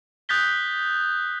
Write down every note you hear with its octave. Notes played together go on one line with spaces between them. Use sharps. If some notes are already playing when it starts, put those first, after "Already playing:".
D#6 F#6 G6 A6 B6 G7